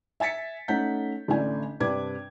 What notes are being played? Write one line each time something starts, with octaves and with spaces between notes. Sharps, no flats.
E5 G#5 A6 B6 C#7
A3 C#4 D#4 F#5 G6 B6
A1 D3 A3 D4 G#5
G2 C3 D4 B4 D6 G#6